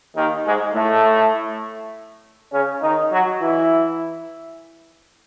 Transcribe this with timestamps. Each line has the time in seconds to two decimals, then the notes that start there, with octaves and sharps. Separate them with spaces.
0.16 D#2 D#3
0.45 G#2 G#3
0.74 A2 A3
2.53 C#3 C#4
2.82 D#3 D#4
3.12 F#3 F#4
3.41 E3 E4